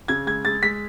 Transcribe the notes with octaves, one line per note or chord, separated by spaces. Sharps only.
C#3 G#6
G#3 G#6
G#3 A6
G#3 B6